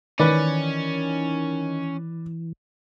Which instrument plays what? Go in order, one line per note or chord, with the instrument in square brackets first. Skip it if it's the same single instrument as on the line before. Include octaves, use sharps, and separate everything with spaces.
[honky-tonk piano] D#3 [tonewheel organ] E3 [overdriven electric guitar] C#4 [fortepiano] B4 D5